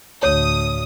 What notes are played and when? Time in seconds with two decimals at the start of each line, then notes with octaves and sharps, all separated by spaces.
0.23 D2 A2 C#5 D#6